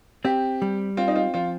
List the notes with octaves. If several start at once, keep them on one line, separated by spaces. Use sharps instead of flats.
C4 G4
G3
C4 F4
D#4
F4
F3 F4